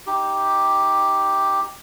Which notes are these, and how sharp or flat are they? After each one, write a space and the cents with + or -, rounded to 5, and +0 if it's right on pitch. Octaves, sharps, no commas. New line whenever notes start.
D#4 +15 G4 +0